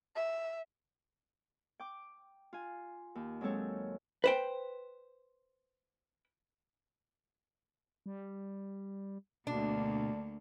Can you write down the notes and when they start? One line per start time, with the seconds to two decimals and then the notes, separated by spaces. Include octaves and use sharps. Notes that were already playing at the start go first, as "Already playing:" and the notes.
0.15 E5
1.80 G5 D6
2.53 F4 G#5
3.15 D#2
3.41 F#3 G#3 C4 A4 C#5
4.24 B4 C5 G5
8.06 G3
9.47 D2 B2 A#3 D4